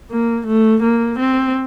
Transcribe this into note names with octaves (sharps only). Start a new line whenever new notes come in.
A#3
A3
A#3
C4